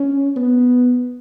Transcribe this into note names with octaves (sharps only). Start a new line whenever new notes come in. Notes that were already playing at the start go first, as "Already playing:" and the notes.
Already playing: C#4
B3